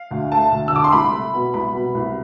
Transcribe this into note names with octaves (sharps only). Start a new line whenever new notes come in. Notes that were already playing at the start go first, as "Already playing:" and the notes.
Already playing: F5
D2
A3 A5
D2
E6
D3 D6
C6
C2 B5
A3
B2
C2 B5
B2
C2